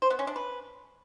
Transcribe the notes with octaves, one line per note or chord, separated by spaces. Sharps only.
C5
B3
C#4
D4
B4